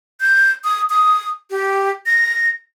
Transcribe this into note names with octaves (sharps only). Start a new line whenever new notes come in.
G6
D#6
D#6
G4
A#6